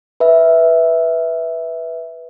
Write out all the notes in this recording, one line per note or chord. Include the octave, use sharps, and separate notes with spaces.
B4 E5